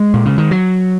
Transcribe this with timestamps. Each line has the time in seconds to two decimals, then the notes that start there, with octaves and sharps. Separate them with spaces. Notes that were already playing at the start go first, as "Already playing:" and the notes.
Already playing: G#3
0.14 A#2
0.26 C#3
0.38 D#3
0.51 F#3